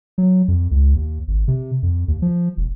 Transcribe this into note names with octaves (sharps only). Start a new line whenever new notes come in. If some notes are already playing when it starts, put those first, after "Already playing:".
F#3
F2
C#2
D#2
G#1
C3
F2
D#2
F3
E1